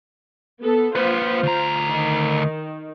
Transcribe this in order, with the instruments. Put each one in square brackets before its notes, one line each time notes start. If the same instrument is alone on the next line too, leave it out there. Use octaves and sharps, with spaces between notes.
[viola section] B3 A4
[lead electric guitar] A#3 B4 [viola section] F4 C5
[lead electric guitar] D2 A#5
[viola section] D#3